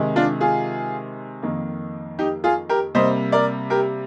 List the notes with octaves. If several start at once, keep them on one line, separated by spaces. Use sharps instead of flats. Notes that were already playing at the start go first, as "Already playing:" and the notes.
Already playing: C3 D#3 G#3
D4 F4
F4 G#4
F2 D#3 A#3
D#4 G4
F4 G#4
G4 A#4
C3 G3 A#3 C5 D#5
A#4 D5
G4 A#4